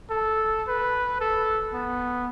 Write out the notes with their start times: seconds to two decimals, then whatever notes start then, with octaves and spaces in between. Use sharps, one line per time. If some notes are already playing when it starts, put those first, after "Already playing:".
0.10 A4
0.68 B4
1.21 A4
1.74 B3